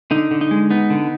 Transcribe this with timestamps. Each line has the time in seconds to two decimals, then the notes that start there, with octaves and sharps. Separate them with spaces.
0.11 D3 D#4
0.31 D3
0.41 D#4
0.51 G#3
0.70 B3 D#4
0.90 D3